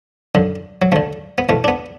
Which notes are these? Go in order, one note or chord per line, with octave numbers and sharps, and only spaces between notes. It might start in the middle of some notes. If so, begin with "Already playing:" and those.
F#2 D3
F#3
D2 D3 A3
B3
E2 B2 A3
D4
B3